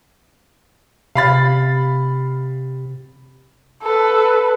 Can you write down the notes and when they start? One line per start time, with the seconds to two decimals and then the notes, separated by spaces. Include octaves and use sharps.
1.15 C3 F5 B5 A6
3.83 A4 B4